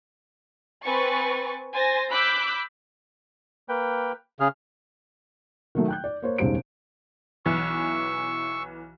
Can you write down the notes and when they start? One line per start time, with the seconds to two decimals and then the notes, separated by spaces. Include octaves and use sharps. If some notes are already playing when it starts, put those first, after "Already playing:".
0.84 C4 B4 G#5 C#6 A6 C#7
1.73 C5 G#5 A6 A#6
2.11 B5 D6 E6 F#6 G6 B6
3.69 A#3 B4 G5
4.40 C#3 G#4 F6
5.75 D#3 F#3 A3
5.88 G5 F#6 G6
6.04 D5
6.22 A#3 C5 C#5
6.38 E1 C#2 G#2 G3 C5 D7
7.46 B1 E3 C#6 E6